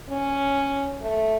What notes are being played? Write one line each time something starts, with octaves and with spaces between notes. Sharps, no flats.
C#4
A3